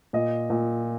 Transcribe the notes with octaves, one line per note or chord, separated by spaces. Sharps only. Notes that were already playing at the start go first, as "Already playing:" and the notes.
A#2 D#5
A#2